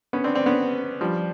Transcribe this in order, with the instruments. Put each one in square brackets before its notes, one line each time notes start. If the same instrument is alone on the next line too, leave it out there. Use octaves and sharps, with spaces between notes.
[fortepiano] B3 C#4
C4 D4
C4 D4
B3 C#4
F3 G3